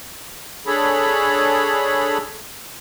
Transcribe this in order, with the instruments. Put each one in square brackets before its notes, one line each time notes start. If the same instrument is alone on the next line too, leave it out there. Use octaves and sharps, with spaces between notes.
[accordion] D4 G#4 A4 C#5 B5